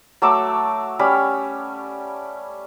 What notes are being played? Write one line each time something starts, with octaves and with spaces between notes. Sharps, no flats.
F#3 A3 D6 E6
G3 C#4 D5 B5